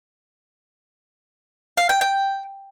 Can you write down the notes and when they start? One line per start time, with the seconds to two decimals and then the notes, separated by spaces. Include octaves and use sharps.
1.77 F5
1.89 G5
2.01 G5